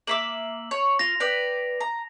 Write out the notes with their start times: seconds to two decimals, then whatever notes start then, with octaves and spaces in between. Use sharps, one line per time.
0.07 A#3 E5 D6 F#7
0.71 C#5
0.99 F4 A#6 F7
1.20 B4 D5 G5
1.80 A#5